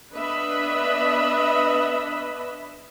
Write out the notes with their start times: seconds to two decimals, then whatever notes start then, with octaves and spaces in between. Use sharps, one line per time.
0.14 B3 D4 B4 D#5 E5 B5